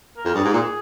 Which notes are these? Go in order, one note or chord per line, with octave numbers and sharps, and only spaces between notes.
A#4
F2
G2 G#4
G#2
A#2